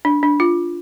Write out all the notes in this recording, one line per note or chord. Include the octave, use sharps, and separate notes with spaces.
D4
D4
F4